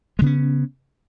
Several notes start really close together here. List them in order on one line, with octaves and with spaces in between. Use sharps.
G#3 C#3 B3 C#4